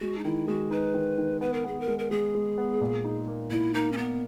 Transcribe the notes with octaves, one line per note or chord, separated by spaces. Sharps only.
G#3 F#4
D#4
D#3 E4
G#3 F#4
D#4 B4
D#3
D#3
B3 B4
A#4
B3 G#4
A#4
G#3
A#4
G#3 G#4
G#3
B3
A#2
D#4
A#3
A#2 E4
A#3 D#4
C#4
A#3 B3